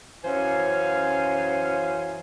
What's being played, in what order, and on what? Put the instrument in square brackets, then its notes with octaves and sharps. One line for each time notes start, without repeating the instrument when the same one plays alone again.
[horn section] F#2 E3 C#4 C5 F5 G#5